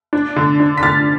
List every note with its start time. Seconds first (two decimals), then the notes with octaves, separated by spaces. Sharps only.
0.13 D4
0.36 D3
0.60 D4
0.78 B6
0.83 D3 F6 A6